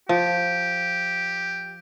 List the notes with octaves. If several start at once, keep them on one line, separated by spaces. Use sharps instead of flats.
F3 G4